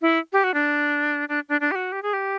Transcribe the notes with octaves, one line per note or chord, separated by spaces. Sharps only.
E4
G4
F#4
D4
D4
D4
D4
G4
F#4
G4
G#4
G4